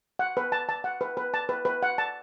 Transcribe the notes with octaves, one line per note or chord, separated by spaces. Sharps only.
F#5
B4
A5
A5
F#5
B4
B4
A5
B4
B4
F#5
A5